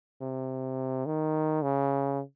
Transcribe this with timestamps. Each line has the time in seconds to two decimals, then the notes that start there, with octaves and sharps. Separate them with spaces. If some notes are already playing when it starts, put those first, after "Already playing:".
0.21 C3
1.06 D#3
1.62 C#3